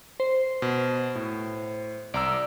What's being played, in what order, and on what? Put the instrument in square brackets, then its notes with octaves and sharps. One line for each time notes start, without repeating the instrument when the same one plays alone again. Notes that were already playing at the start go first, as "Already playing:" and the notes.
[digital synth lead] C5
[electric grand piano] B2
A2
[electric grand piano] C2 A#5 E6 [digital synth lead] D5